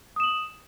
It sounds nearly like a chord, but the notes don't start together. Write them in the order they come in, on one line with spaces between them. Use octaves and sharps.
D#6 E7 F#7